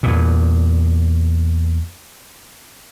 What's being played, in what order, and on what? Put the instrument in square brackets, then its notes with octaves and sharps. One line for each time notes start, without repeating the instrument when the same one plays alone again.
[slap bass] E2 A#2